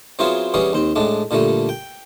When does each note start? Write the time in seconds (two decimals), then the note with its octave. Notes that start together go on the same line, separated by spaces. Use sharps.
0.19 F#3 B3 C4 E4 F4 G#4
0.54 E3 G3 B3 C#4 G#4
0.73 D#2 C4
0.96 A2 G#3 D4
1.31 A#2 D3 G3 A3
1.69 G5